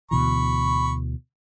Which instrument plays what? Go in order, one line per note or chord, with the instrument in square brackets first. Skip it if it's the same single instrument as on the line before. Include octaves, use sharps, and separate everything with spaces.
[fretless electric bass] D2 B2 E3 [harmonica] B5 C#6